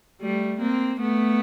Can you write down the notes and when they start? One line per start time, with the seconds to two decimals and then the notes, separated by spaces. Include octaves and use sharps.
0.21 G3 A3
0.61 A#3 C4
1.00 A3 B3